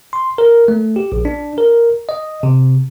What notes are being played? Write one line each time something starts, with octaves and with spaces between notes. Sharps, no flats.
C6
A#4
A3
G4
A#1
D4
A#4
D#5
C3